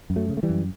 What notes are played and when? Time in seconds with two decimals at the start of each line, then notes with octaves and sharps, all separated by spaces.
0.10 F#2
0.16 F#3 A3
0.29 C#3
0.37 A3
0.43 E3 G3
0.50 F#2